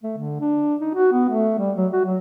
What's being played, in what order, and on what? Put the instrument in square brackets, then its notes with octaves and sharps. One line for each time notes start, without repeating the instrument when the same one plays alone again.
[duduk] A3
D3
D4
D#4
F#4
B3
A3
G3
F#3
F#4
F#3